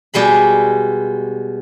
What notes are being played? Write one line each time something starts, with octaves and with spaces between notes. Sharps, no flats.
B2 G3 G#3 B5